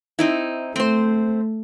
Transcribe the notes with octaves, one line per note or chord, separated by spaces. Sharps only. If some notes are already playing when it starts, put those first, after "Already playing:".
C4 D#4 E4
A3 C4 C5